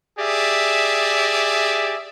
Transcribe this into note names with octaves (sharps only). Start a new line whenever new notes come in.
G4 G#4 D5 E5